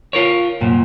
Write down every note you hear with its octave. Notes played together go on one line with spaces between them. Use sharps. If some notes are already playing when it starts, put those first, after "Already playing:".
F4 A#4 C#5
C2 F#2 A#2